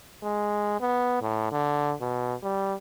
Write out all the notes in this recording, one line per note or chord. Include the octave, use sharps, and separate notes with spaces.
G#3
B3
A2
D3
B2
G3